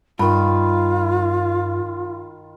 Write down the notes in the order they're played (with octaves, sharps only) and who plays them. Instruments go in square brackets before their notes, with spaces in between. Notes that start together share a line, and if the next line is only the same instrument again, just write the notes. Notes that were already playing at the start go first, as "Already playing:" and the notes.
[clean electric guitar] G2 [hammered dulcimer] D#3 B5 [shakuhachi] F4